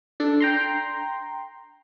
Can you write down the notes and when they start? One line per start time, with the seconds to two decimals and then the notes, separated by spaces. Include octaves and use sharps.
0.20 D4 A4
0.40 G5 A#5 C6